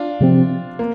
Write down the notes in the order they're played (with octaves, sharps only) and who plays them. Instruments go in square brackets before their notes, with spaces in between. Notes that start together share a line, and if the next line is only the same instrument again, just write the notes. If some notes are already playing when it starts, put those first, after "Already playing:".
Already playing: [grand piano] D4 F4
[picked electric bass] C3 F3 C4
[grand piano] A#3